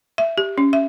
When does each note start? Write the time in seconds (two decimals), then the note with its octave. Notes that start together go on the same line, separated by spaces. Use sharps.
0.18 E5
0.38 G4
0.58 C#4
0.73 E5